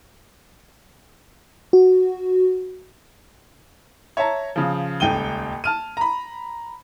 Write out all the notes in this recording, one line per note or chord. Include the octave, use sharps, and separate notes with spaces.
F#4
C#5 E5 A5 A#5
C#3 F3
D#1 C#2 G5 D#7 G7
A5 F6 D#7
A#5 B5